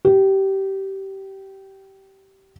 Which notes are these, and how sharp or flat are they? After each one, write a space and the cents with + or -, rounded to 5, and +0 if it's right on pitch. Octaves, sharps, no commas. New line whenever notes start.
G4 -20